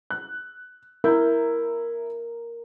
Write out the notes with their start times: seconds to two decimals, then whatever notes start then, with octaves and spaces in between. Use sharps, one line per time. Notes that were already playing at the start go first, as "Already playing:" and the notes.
0.10 F#6
1.04 E4 A#4 E5 G6